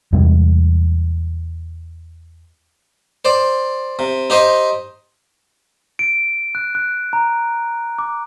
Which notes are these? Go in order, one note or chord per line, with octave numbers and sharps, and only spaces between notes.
E2 C3 G3 G#3
C5 D5
C3
D#4 G4 C5 D#5
D7
F#6
F#6
A#5
D6